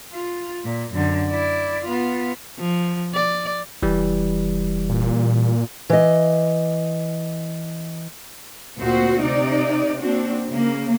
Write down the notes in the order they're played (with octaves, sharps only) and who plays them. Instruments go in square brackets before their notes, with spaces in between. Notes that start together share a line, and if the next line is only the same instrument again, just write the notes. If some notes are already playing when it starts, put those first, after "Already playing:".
[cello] F4
A#2
F#2 D3
E4 D5
B3 F4
[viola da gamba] F3
D5
[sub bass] F1 [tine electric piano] E3 G3
[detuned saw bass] A#2
[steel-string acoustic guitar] E3 D#5
[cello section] D2 A#2 C4 F#4 C5
C3 D#4 D5
A#3 C4 D4 F#4
C#3 A#3